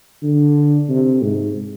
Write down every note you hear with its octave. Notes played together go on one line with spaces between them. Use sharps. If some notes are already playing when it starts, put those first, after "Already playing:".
D3
C3
G#2